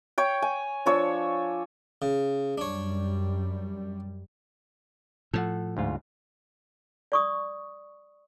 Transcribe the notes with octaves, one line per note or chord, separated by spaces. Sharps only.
C#5 G5
G#5
F3 D4 C#5 E6
C#3
F#2 G3 D4 C#5
A2 F3 A4 F#5
D2 G#2 F4
D5 C#6 D#6